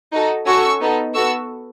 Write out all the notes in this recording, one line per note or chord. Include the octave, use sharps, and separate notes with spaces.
D#4 F#4 A4
C#4 F#4 A4 C#6 E6
B3 D#4 A4
B3 F#4 A4 C#6 E6